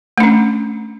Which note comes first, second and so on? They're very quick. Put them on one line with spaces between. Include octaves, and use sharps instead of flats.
A3 D4 C#4